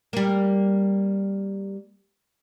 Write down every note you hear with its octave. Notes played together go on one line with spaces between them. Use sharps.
G3 A#3